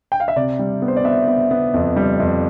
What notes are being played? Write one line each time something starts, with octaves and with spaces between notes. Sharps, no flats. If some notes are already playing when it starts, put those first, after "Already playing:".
G5
F5
E5
C3 D5
G3
B3
C5
D5
B3 E5
B3
B3
F2
G3
F2